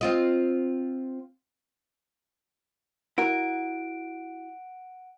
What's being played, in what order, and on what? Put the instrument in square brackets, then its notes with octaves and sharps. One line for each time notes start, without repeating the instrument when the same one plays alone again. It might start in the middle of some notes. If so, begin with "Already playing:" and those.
[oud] C4 F4 D#5
[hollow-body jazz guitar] E4 F#4 A#4 [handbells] F#5 D7